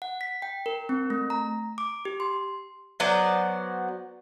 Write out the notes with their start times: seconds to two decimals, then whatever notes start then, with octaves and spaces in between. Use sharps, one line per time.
0.02 F#5
0.21 B6
0.42 G5
0.66 A#4
0.89 C4
1.10 A3
1.30 A#5
1.78 D6
2.05 G4
2.20 C6
3.00 F#3 B3 C5 D5